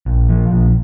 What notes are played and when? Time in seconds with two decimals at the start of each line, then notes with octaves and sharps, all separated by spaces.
0.06 A#1
0.29 F3
0.52 A#1